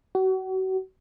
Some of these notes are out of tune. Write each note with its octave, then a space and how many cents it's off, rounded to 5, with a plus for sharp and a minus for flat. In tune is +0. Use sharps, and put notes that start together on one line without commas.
F#4 +35